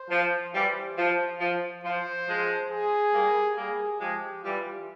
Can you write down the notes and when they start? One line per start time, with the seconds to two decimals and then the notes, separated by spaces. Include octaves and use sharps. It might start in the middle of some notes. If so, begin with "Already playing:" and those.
Already playing: C5
0.10 F3
0.53 E3 G3 C5
0.97 F3
1.41 F3
1.84 F3 C5
2.28 F3 G#3
2.71 G#4
3.13 G3 A#3
3.57 G3 A#3 G#4
4.00 F3 G#3 G4
4.43 E3 G3 F4